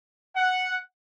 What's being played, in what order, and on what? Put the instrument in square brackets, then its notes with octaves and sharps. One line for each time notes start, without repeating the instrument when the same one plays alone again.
[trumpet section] F#5